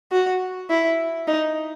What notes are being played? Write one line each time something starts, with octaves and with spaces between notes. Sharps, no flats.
F#4
E4
D#4